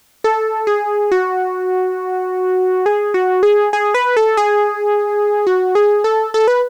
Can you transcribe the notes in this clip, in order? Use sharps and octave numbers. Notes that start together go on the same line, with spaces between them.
A4
G#4
F#4
G#4
F#4
G#4
G#4
B4
A4
G#4
F#4
G#4
A4
A4
B4